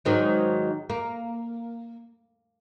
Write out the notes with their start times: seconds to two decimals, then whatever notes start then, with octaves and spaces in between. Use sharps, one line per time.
0.05 G#2 D#3 F#3
0.90 A#3